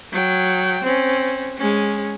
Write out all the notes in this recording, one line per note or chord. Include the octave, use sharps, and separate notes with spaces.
F#3 G5
C4 C#4
G#3 C#4